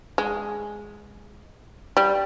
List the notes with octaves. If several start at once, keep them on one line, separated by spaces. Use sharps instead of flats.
G#3
G3